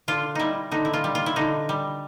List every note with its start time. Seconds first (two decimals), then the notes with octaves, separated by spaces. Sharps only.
0.08 D3 F4
0.35 G3 D#4 E4
0.71 D3 D#4
0.85 E4
0.93 F4
1.04 G3
1.15 F4
1.26 E4
1.36 D3 D#4
1.69 G3